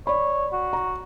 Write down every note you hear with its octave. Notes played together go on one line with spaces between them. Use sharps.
C#5 D5 B5
F#4
A#5